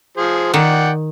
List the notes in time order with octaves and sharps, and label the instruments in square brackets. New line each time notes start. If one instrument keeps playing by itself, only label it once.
[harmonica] F3 G#4 C5
[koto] D#3 [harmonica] D5 F#5 G5